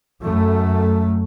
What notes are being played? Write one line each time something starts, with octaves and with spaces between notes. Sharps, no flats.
F#2 A3